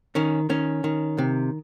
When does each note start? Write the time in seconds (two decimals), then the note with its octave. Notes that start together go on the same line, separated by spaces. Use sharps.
0.15 D#3 C#4
0.50 D#3 C#4
0.84 D#3
1.18 C3